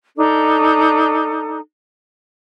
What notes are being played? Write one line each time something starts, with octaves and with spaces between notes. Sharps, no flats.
D4 D#4 A4